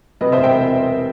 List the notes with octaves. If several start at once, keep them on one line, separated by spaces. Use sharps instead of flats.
C3 B4 D#5
C5 E5
E1
E5 G5